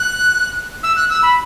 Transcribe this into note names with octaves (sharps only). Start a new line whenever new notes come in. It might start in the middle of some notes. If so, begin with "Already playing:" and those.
Already playing: F#6
E6
F#6
E6
B5